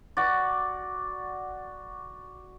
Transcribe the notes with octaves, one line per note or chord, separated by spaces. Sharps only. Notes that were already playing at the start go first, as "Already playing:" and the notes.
F#4 D5